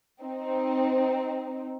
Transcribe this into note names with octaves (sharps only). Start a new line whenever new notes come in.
C4 D#4